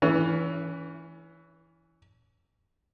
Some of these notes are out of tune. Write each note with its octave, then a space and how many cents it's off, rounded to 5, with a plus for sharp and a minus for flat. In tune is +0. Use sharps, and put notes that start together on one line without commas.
E3 +0 C#4 +30